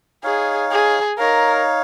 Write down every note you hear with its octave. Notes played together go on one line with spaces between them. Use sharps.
D#4 G#4 C#5 F5
G#4
D#4 A#4 C#5 F5